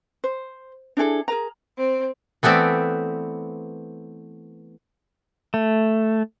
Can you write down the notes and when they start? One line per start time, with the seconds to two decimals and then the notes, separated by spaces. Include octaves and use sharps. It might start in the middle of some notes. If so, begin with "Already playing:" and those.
0.24 C5
0.97 D4 E4 G#4 A4
1.28 G#4 A#4 A#5
1.77 C4
2.43 E3 A3 B3 C4 D5
5.54 A3